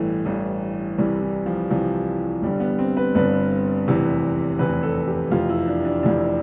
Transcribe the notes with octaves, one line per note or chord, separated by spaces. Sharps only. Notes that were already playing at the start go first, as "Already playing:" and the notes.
Already playing: A1 G2 E3 A3
A1 G2 E3
C2 C3 E3 G3
E3
F3
C2 C3 E3 F3
G1 G2 D3 G3
B3
C4
B4
G1 G2 D3 B4
F1 E2 C3 E3
F1 E2 C3 E3 B4
A4
G4
F1 F2 C3 E3 F4
E4
D4
D4
F1 F2 C3 E3 D4